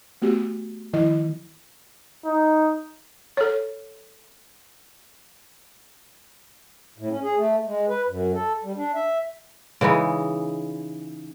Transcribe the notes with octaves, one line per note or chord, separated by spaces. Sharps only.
A3 B3 F#4 G4
D#3 F3 E4 D#5
D#4
A4 C#5
A2
C#4
G#4
A3
G#3
B4
F#2
A4
G3
D4
E5
C#3 E3 G#3 D#4